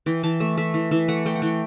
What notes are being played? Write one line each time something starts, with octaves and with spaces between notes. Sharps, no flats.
E3 G5
E3 A5
A3 E5
A3 E5
E3
E3 E5
A3 F#5
A3 G5
F#5
E3 G5